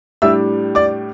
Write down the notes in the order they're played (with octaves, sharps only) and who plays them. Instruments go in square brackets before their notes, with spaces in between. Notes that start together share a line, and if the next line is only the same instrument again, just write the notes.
[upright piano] A2 G3 D4 E5 E6
D5 D6